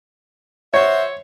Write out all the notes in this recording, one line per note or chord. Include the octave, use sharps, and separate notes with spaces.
F#4 C5 C#5 E5